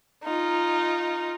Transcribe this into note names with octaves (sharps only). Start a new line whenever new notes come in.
D#4 F4